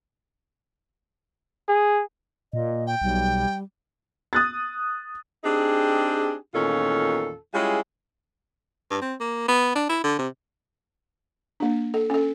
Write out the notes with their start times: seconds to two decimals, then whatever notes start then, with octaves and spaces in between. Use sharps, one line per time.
1.68 G#4
2.53 A#2 D#5
2.87 G5
3.02 B1 G3
4.33 D#6 F#6 A6
5.44 C4 D4 D#4 G4 G#4
6.53 E2 A#2 D#3 C#4 F4 A4
7.54 G3 G#3 C#4 E4 F4 G#4
8.90 G2
9.02 C4
9.20 A#3
9.48 B3
9.75 D4
9.89 E4
10.04 D3
10.19 C3
11.60 A#3 D4
11.94 A4
12.10 C#4 A4